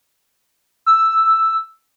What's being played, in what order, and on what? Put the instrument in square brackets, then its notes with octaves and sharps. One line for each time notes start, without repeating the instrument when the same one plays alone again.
[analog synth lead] E6